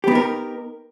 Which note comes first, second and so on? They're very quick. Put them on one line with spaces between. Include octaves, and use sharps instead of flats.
G4 B3 D#4 A#4